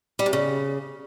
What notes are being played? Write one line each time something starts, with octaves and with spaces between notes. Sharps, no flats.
G3
C3
C#3